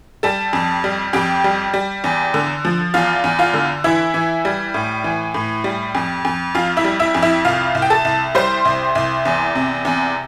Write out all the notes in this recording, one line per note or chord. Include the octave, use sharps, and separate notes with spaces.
G3 A4 A5
F2
G3
F2 G4 G5
G3
G3
E2
D3
F3
E2 F4 F5
E2
F4 F5
D3
E3 E4 E5
E3
G3
A2
E3
A2
G3
F2
F2
F2 F4 F5
E4 E5
G3
E4 E5
F2
E4 E5
C2 F4 F5
C2
G5
A4 A5
C2
G3 C5 C6
C2
C2
E2
C3
E2